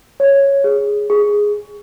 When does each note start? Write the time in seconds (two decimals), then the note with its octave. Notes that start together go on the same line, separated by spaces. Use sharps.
0.20 C#5
0.64 G#4
1.10 G#4